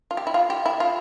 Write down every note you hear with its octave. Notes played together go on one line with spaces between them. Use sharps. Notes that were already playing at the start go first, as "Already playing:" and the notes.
F4
G4
E4
F4
G4
E4
F4